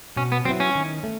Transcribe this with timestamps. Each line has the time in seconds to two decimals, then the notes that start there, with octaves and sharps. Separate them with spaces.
0.16 B2 C#4
0.32 B3
0.45 F#3 C4
0.48 B3 E4
0.60 C#4
0.75 D#3
1.04 A3